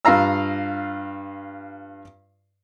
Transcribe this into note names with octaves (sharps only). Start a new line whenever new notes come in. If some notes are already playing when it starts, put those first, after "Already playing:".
G2 F4 F5 A#5 E6